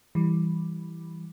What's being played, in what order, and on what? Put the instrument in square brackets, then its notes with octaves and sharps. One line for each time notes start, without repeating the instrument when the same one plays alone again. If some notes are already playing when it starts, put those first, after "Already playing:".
[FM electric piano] E3 G3